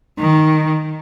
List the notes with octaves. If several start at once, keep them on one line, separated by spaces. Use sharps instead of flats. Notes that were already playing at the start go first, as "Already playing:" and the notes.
D#3